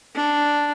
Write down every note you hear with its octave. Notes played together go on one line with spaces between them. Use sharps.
D4